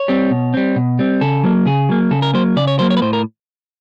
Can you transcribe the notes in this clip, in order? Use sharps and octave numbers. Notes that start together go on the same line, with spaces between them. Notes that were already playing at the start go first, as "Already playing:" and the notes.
Already playing: C#5
G3 C4
B2
G3 C4
B2
G3 C4
C#3 A4
F#3 A#3
C#3 G#4
F#3 A#3
C#3 A4
A#4
F#3 A#3 C5
C#3 D5
C#5
F#3 A#3 C5
C#5
B4
A2 C5
A#4